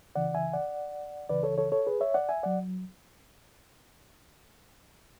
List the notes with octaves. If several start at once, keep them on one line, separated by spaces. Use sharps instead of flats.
C#2 C#3 E3 D5 F#5
E5 G#5
D5 F#5
C#2 C#3 E3 B4 D5
A4 C#5
A4 C#5
A4 C#5
G#4 B4
C#5 E5
D5 F#5
E5 G#5
F#3 D5 F#5